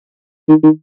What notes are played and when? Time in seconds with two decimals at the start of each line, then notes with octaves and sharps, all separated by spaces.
0.49 D#3
0.64 D#3